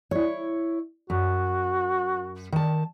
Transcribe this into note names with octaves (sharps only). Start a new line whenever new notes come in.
E4 C#5
F#2 F#4
D#3 A5